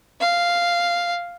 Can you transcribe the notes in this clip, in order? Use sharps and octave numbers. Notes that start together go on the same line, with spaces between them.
F5